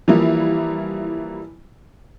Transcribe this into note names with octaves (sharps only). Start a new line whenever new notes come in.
E3 F3 G3 A#3 E4